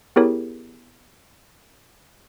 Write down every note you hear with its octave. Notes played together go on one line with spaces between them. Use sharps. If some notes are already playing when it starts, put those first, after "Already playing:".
B3 E4 G4 G#4 A#4 C#5